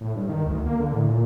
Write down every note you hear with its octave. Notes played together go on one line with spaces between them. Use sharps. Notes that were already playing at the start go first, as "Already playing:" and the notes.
A2
G2
D#3
D2
A#3
D3
A2
A#2